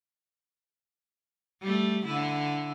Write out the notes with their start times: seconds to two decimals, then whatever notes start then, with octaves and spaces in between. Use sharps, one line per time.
1.62 G3 A3
2.05 D3 E4